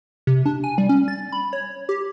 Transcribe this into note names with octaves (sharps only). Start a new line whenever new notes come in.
C3
D4
G#5
G3
C#4
A6
B5
C#5
G4